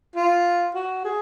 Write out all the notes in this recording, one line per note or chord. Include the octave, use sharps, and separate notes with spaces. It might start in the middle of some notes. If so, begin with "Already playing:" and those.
F4
F#4
G#4